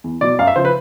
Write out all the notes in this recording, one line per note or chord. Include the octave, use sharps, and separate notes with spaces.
E2
B2 F#3 D5
F#2 F5
E5
C#3 F3 C5
B4